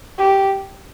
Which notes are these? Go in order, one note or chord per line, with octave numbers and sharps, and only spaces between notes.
G4